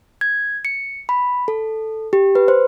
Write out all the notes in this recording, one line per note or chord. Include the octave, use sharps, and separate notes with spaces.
G#6
C#7
B5
A4
G4
B4
C5